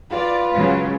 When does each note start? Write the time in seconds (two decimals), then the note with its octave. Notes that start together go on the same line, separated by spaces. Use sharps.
0.10 F4 B4 D5
0.53 C#3 F#3 G#3